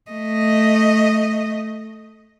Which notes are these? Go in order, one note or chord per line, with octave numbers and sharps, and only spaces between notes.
A3 D#5